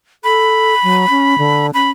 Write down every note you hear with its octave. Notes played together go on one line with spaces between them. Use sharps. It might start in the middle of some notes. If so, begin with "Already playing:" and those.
A4 B5
F#3
C#4
D3
C#4 B5